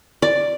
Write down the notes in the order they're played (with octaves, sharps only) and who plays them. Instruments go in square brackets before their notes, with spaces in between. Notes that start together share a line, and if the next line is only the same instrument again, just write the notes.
[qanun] D5